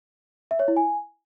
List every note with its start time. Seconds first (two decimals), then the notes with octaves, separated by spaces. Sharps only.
0.51 E5
0.59 C#5
0.68 E4
0.77 G#5